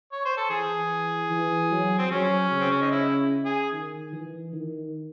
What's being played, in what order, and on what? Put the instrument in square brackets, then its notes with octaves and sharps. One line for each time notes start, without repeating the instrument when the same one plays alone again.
[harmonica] C#5
C5
A4
[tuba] E3 [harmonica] G#4
[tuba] E3
F#3
[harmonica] C4
[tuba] F#3 [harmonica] C#4
[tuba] C#3
[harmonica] C4
C#4
D#4
E4
G#4
[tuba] D#3
E3
D#3